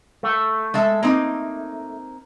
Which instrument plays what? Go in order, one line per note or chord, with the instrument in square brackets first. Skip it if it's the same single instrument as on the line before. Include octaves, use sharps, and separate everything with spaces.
[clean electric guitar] A3
[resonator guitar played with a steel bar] G#3 A4 E5
A#3 C4 D#4